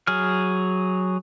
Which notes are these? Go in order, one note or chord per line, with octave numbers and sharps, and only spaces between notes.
F#3 G#4 F6